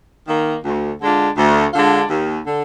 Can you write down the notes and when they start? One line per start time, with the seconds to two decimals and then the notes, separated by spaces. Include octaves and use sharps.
0.28 D#3 A#3
0.65 D2
1.01 D3 G#3 D4 F4
1.37 D2
1.74 D3 G#3 D4 F4
2.10 D#2
2.47 D3